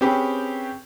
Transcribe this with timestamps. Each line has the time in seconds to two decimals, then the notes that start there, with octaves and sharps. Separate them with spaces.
0.01 C4 C#4 G4 G#4 B4